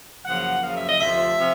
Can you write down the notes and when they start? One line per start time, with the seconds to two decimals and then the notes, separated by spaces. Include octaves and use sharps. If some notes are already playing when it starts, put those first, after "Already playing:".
0.25 F#2 C#3 F3 A#3 F#5
0.62 F#2 C#3 F3 A#3 F5
0.75 E5
0.87 D#5
1.00 D2 C3 F3 E5
1.39 C3 F3